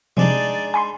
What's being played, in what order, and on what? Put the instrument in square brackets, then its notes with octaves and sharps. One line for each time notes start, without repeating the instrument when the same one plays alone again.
[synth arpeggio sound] C3 F3 G3 [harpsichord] G#3 D4 D#4 [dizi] D5
[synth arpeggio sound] G#5 B5 C6